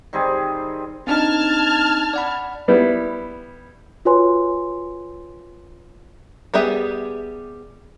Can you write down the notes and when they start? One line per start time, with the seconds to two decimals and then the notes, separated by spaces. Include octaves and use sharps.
0.13 D#3 G3 C4 G#4
1.07 C4 D4 D#4 A5 F6 G#6
2.14 D5 F#5 B5
2.68 G3 B3 E4
4.05 F4 F#4 B4 C#5 G#5 C6
6.54 G3 B3 G4 G#4 E5